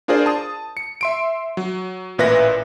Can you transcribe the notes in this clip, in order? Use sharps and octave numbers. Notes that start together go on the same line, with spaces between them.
D4 F4 G#4 A#4 C5 D5
A5 D#6
C#7
E5 C6 D7
F#3
A1 A#2 B4 E5 F#6 A#6